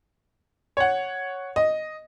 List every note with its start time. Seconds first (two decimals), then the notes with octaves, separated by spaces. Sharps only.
0.77 C#5 F#5
1.56 D#5